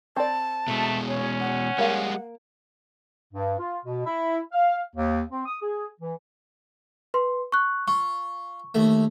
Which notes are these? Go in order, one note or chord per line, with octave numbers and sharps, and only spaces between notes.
C4 D5 A5
B2 G#3 A3
C#4 C#5
F#5
G3 G#3 A#3 F5
G2
F4
B2
E4
F5
D#2
C4
D#6
G#4
E3
B4 C6
C#6 F#6
F4 C#6
D#2 A3